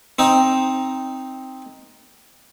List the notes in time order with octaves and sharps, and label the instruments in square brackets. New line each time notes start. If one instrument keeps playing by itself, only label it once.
[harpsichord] C4 D#4